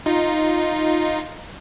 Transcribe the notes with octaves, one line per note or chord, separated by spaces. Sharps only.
D#4 F4